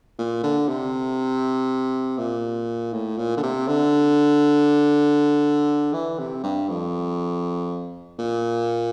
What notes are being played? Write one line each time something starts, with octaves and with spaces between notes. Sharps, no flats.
A#2
D3
C3
A#2
A2
A#2
D3
C3
D3
E3
C3
G2
F2
A#2